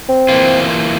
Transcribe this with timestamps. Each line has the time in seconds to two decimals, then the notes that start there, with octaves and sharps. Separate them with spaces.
0.09 C4
0.29 E3 A#3 F4